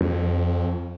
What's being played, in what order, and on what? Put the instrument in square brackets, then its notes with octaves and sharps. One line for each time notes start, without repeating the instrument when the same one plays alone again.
[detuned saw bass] F2